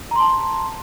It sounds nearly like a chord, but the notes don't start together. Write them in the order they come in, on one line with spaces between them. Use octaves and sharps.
A#5 C6 A5